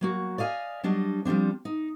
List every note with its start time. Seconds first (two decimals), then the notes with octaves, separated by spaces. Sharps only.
0.01 F#3 A#3 F#4
0.38 D5 D#5 F5 G#5
0.84 F#3 G3 D4 D#5
1.25 F3 G3 A#3 C4 D4
1.65 D#4